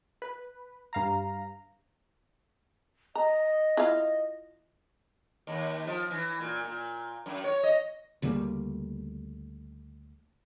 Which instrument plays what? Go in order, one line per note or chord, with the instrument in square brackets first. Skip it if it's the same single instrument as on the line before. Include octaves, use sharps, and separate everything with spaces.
[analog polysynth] B4
G2 F5 A#5
[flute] D#5 [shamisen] A#5
[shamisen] E4 F4 F5
[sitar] D#2
F3
E3
A#2
A#2
F#2
C#5
D#5
[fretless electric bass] D2 C#3 G3 A#3